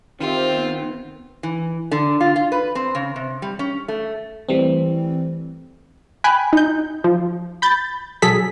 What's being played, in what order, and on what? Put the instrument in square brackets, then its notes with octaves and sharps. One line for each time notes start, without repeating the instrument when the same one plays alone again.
[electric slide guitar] D#3 [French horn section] C4 [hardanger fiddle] F4 [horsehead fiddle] G4 E5
[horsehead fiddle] B3
[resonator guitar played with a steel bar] E3
D3
F4
F4
B4
C4
C#3
C3
G3
C#4
A3
[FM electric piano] E3 G3 A3 C4
[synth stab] G5 G#5 B5 F#6
D#4 G6
F3
B5 G6 A6
B1 F#3 G#4 A4 B6